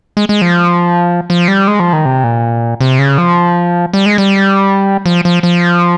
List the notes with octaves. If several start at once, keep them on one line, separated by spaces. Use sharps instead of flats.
G#3
G#3
F3
F3
G3
G#3
F3
D#3
C3
A#2
C3
C#3
F3
G3
G#3
G3
F3
F3
F3